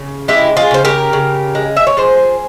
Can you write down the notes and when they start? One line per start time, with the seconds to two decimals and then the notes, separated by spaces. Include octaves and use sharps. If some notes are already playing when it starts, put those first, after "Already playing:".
Already playing: C#3
0.28 G#3 E4 G4
0.57 F4 G#4
0.71 C#3 C5
0.85 G4 A#4
1.13 C#3
1.55 G#3
1.77 E5
1.87 C#5
1.97 F3 G#4 C5